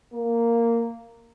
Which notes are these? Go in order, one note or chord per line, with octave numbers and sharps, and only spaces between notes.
A#3